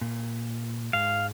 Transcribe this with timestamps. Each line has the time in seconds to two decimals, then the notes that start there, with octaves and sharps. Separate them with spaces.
0.01 A#2
0.93 G#2 G#3 F5